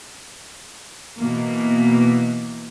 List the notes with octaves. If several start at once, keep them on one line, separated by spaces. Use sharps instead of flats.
B2 E3 A#3